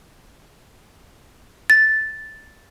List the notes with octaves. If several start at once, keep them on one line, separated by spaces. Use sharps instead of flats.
A6